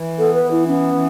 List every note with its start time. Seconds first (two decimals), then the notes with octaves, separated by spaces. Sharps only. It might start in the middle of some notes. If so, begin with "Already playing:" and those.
Already playing: E3
0.18 B3 A4
0.35 B4
0.44 E3
0.51 E4
0.68 B3 C#4
0.94 E3